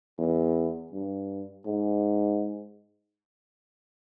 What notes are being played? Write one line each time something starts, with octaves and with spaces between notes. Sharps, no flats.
E2
G2
G#2